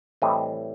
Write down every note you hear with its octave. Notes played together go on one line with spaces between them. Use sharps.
A2 E3 G3 C4 D#5